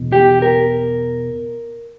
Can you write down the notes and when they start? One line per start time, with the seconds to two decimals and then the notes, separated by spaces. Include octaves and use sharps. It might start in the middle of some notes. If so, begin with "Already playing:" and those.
Already playing: E2 B2
0.12 G4
0.42 A#4